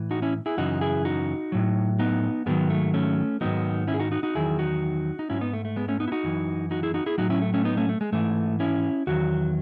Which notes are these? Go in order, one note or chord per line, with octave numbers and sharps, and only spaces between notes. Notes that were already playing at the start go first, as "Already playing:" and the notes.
Already playing: A2 E3
D#4 F#4
C#4 E4
E4 G#4
F#2 C#3 E3 D#4 F#4
E4 G#4
D#4 F#4
A2 F#3
B3 D#4
G#2 D#3 F#3 G#3 B3
A3
A3 C#4
G#2 D#3 F#3 B3 D#4
C#4 E4
G#4
D#4 F#4
D#4 F#4
D#4 F#4
E2 D#3 F#3 E4 G#4
D#4 F#4
D#4
G#2 F#3 C#4 E4
B3 D#4
A3
A3
G#3 B3
A3 C#4
B3 D#4
E4
D#4 F#4
F#2 E3
D#4 F#4
E4 G#4
D#4 F#4
E4 G#4
A2 F#3 D#4 F#4
C#4 E4
A3
A3 C#4
B3 D#4
A3 C#4
A3
G#3
G#2 E3 A3
C#4 E4
E2 D#3 F#3 F#4